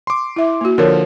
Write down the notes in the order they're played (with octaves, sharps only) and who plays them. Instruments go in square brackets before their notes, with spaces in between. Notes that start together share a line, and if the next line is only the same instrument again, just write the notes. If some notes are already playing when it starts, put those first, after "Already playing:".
[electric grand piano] C6 D6
[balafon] E4 E5
A#3 F#4
[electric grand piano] D3 F3 [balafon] A#4 C#5